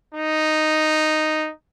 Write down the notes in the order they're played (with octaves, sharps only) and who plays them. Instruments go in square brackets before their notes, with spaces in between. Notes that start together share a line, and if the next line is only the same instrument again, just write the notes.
[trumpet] D#4